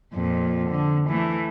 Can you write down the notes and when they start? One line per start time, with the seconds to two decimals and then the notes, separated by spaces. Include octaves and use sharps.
0.13 F2 A#2
0.70 D3
1.09 E3 A3